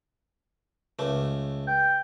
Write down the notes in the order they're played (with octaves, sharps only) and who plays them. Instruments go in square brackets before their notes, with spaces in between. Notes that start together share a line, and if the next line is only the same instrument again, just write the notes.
[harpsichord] C#2 A3
[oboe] G5